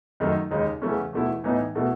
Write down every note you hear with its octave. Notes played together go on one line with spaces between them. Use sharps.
F#2 D#3 A3 D#4
D#2 C#3 G#3 D#4
E2 C#3 E3 A3 C#4
E2 B2 A3 E4
A2 E3 B3 D#4
B2 A3 E4